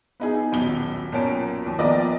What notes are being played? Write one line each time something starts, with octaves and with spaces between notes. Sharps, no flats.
B3 D#4 G#4
D#1 B1 G7
B1 A#2 C#4 A#4 A5 D7
D#2
A#1 A#2 B3 A#4 D5 D#5